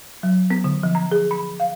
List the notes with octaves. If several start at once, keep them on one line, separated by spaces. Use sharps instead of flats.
F#3
B3
D3
F3
A#5
G#4
B5
F5